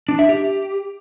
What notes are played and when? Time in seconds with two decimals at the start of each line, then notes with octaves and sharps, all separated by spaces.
0.09 D4
0.19 E5
0.29 G4